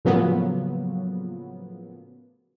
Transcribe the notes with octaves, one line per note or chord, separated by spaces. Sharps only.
A2 C#3 F3 F#3 A#3 B3